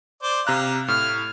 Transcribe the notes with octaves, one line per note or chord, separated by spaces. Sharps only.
C5 D5
C3 F5 A#5 F#6
A2 F6